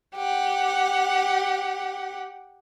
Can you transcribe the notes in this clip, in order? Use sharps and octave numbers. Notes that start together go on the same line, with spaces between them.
G4 F#5